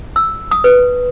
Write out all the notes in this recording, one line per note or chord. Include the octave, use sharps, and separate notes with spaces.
E6
D#6
B4